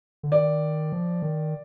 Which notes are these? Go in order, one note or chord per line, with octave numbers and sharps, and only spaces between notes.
D3
D#3 D5
F3
D#3